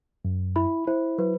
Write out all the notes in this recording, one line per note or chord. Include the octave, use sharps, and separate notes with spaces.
F#2
E4 B5
E4 C5
F#3 B4